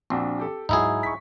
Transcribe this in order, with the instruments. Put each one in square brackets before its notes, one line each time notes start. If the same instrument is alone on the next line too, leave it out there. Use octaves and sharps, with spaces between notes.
[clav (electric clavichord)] A#1 [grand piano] C4 D4 F#4
[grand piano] G4 A4
[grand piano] G#2 F#3 [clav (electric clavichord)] D#4 E4 G#4
[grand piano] C#6 B6